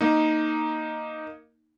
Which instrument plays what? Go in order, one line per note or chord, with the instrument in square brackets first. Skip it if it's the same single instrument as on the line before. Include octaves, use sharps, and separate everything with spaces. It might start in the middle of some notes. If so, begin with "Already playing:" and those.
[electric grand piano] A#3 D#4